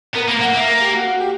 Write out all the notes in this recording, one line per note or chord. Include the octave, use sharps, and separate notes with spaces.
B3 A#4
A#3 A#4
A#3 F#5
A#3 E5
A#4
G4
F#4
F#4
G4